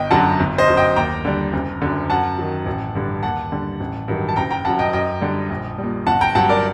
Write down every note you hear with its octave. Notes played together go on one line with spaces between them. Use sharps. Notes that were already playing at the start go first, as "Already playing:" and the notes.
Already playing: G1 D#5 G5
F#2 D3 F#3 F#5 A5
G1
C5 D#5
F#2 F#3
D#5 G5
D#2 G5 A#5
D3 G3
F#1
F#2 D3
F#2 F#5 A5
D#3 F#3
A1
G2 D3
D#2 F#5 A5
D3 G3
A1
G2 D#3 F#3
A5
F#1 G5 A#5
G5 A#5
F#2 F#3 F#5 A5
D#5 G5
F#2 D#5 G5
D3 G3
A#1
A#2 G3
G1 F#5 A5
G5 A#5
G2 F#3 F#5 A5
A#4 D5